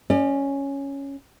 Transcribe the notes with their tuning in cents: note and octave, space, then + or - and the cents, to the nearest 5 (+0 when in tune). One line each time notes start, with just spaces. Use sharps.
C#4 +0 D5 +35